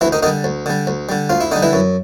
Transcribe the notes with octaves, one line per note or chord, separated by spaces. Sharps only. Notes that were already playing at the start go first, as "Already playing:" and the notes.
D2 E3 E4
D#3 D#4
D3 D#3 G3 D#4
D2
D3 G3
D2
D3 G3
D2 F4
E4
D3 G3 D#4
E3 E4
F#2